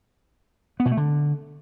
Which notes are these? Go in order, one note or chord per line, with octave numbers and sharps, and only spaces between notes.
B3
B2
A3
D3